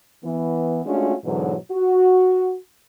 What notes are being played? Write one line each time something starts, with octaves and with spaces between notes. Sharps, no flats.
E3 B3
G#3 A3 C#4 D4 F4 F#4
G#2 B2 D3 E3 F#3
F#4